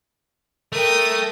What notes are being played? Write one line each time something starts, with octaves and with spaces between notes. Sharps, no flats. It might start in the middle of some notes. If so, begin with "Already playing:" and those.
A3 A#4 G5 D#6